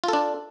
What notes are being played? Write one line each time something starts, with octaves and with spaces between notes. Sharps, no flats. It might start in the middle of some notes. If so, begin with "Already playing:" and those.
D4 F4 A4